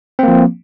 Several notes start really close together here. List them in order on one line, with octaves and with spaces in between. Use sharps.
C4 A#3 F3